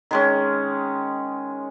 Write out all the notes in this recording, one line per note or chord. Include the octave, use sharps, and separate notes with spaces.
D#3 G#3 C#4